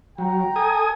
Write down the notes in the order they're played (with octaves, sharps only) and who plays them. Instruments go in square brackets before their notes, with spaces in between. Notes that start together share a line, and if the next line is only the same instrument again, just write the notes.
[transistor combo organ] F#3 [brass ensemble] G5 A#5
[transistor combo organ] A4 G#5 D#6